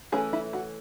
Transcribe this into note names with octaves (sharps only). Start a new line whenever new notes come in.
E3 A3 C#4 G#4
E4
F#4